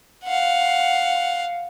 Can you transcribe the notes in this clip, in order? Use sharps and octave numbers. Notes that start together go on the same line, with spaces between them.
F5 F#5